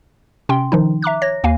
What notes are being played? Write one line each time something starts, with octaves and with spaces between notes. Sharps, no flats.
C3 C#4 G5 C6
D#3 F3 D#4
E5 A#5 D6 F#6
C#5 A#6
D#2 A#3 F5 G#5